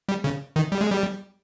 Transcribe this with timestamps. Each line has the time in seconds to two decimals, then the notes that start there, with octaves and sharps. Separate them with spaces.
0.09 G3
0.24 C#3
0.56 D#3
0.72 G3
0.81 G#3
0.91 G3